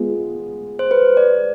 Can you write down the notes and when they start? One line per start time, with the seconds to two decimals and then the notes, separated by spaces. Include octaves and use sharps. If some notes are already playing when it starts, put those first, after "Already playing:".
Already playing: G#3 B3 F4
0.79 C5
0.91 B4
1.17 D5